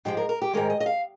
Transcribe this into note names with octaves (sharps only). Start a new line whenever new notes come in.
G#2 F3 G#3 G4
A#4
A#4
G4
G#2 D#3 G#3 A#4
D#5
D#5
F5